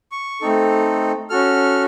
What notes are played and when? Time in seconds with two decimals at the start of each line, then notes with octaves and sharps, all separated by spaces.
0.12 C#6
0.41 A3 C4 D#4 A4
1.30 C#4 F#4 A4 F6